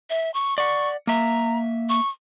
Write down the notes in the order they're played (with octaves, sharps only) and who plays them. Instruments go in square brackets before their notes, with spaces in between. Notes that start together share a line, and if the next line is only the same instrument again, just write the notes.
[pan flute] E5
C#6
[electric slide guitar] D5 F#5 [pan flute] C#6
[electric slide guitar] A#3 E5 [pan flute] A#5
[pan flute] C#6